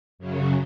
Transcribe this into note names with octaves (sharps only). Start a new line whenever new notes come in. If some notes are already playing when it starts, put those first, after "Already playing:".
F#2 C#3 F#3